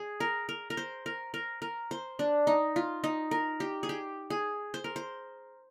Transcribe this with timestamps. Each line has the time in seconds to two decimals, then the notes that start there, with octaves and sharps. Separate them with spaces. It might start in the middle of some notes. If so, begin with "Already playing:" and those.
Already playing: G#4
0.20 A#4
0.49 A#4
0.70 A#4
0.77 C5
1.06 A#4
1.34 A#4
1.62 A#4
1.91 C5
2.19 D4
2.47 D#4
2.76 F4
3.04 D#4
3.31 A#4
3.60 G4
3.83 G#4
3.89 G4
4.30 G#4
4.74 C5
4.84 A#4
4.96 C5